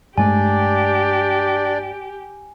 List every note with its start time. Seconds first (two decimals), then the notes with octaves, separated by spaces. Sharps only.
0.18 G2 G#3 A3 D4 G4 D5 G#5